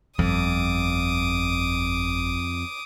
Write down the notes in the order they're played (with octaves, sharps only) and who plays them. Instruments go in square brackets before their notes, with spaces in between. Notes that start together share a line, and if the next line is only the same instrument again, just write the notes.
[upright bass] G1 [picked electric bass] F2 [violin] D6 D#6